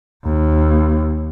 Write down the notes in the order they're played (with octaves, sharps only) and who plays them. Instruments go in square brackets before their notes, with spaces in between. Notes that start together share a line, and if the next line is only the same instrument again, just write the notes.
[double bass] D#2